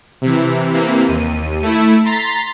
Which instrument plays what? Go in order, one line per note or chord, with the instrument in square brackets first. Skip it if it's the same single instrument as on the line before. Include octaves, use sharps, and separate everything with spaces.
[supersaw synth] C3 E3
C3 E3 A#3
D#2 D#7
A3 E4
A#5 C6 A6 B6